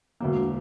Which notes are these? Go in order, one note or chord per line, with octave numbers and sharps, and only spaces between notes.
E1 D2 D3 F#3 A#3